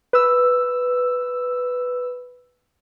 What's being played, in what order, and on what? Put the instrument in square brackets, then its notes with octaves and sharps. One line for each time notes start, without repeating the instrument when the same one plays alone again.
[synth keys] B4 E6